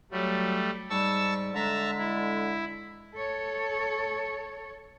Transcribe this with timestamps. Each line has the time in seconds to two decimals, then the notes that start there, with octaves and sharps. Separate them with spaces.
0.11 F#3 G3 A3
0.90 G#2 G3 A5 C#6 E6
1.55 D3 G#3 E5 A5 A#5
1.98 E4
3.15 A4 C#5